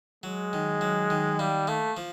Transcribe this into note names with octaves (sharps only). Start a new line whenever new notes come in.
F#3 G#3
D#3
F#3
D#3
G3 A#3
A3 A#3
F3